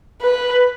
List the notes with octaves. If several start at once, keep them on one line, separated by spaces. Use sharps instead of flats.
B4